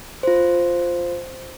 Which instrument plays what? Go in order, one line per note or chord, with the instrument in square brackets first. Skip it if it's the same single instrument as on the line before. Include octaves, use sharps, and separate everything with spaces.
[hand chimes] F4 C5